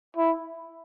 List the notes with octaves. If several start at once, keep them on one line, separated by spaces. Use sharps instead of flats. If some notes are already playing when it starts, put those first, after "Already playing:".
E4